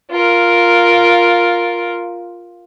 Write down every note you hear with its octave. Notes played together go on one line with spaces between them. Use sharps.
F4 A#4